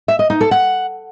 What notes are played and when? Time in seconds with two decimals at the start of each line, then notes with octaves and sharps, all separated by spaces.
0.08 E5
0.19 D#5
0.30 D#4
0.41 A4
0.51 F#5